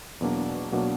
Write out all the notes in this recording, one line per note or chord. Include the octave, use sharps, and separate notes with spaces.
E2 B2 F#3 A#3 D4
B2 F#3 A#3 D4